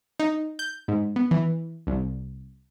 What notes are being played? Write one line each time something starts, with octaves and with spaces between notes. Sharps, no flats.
D#4
G6
G#2
B3
E3
C2